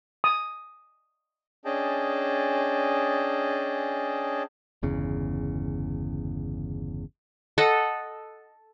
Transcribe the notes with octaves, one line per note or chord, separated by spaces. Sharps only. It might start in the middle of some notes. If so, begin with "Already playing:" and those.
D#6
C#4 D4 G#4 D#5 G5 A5
G1 E2 C#3
A4 D#5 F#5